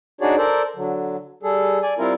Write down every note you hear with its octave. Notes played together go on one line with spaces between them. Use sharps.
D4 D#4 F#4 G#4 C#5 D5
A4 A#4 C5 D5
D3 F#3
G3 G#4 A4
D5 G#5
G3 C4 E4 F4 A#4